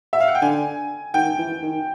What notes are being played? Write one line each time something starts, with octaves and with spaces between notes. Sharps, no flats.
E5
F5
F#5
G5
D3 G#5
D#3 G5
E3
D#3